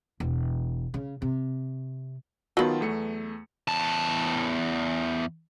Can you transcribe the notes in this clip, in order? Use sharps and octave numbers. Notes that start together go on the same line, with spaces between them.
E1
C#3
C3
D#3 F#3 B3 F4 A5
E2 A3 C#7
E2 A5